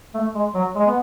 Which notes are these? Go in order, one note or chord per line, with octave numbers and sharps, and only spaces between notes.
A3
G#3
F#3
G#3
B3